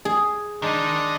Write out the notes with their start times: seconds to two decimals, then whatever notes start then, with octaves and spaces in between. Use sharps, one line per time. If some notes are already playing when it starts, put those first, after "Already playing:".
0.05 G#4
0.62 D#3 G#3 D4 D#5